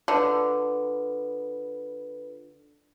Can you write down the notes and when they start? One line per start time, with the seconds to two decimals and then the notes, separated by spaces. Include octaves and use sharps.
0.08 D3 F4 A4 B4